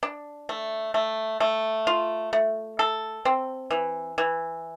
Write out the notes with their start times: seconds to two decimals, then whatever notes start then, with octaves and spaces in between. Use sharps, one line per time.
0.03 D4
0.49 A3
0.94 A3
1.40 A3
1.87 F4
2.33 A3
2.79 A4
3.25 C4
3.71 E3
4.18 E3